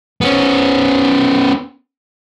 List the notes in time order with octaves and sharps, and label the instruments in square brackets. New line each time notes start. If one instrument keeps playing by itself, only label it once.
[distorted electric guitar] B3 C#4